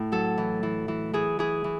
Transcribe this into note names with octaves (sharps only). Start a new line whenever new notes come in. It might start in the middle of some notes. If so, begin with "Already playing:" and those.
Already playing: A2 E4
F#3 A4
E3
E3
E3
E3 G#4
E3 G#4
E3